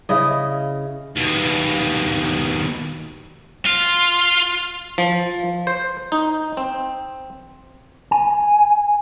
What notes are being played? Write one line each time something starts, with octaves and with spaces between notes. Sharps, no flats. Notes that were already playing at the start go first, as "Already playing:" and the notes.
C#3 E4 D#5
D#2 B2
F4
F3
C5
D#4
C4
G#5